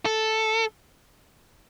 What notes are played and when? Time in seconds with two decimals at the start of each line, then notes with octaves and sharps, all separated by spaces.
0.06 A4